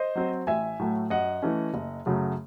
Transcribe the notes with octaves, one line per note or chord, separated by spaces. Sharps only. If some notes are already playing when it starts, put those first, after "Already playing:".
Already playing: C5 D#5
F#3 C4
A1 E5 G#5
A2 F#3 A3
F#2 D#5 F#5
E3 A3 C#4
F#1
F#2 C#3 F#3 A3